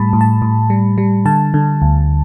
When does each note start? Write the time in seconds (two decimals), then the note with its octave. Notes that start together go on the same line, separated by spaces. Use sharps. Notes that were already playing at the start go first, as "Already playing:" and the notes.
Already playing: A2 G3 A5 B5
0.13 A2
0.21 A5
0.42 A2
0.70 G3
0.98 G3
1.25 D3 A5
1.54 D3
1.82 D2